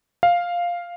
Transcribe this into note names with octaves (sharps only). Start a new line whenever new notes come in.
F5